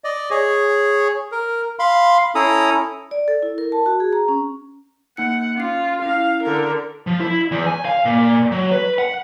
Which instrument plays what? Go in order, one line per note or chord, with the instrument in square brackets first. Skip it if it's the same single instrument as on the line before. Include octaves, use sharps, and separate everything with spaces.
[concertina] D5 D#5
G#4 C#5
A#4
F5 B5 C6
C#4 E4 A4 A#5 D#6
[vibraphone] D5
A4
E4
A#4
A5
F#4
G#4
A#5
C#4
[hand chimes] A#3 D#4 C#7 [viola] F#5
[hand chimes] C#4 C7 [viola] F4
[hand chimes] C#4 E4 [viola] F5
[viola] D3 A#4
[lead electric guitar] F3
E4
E2
G#5
F5
A#2
F#3
B4
F#5